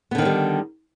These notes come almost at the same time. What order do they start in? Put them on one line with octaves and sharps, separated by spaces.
B3 D3 D#3 C4 G3